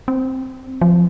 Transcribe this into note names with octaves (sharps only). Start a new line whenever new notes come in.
C4
F3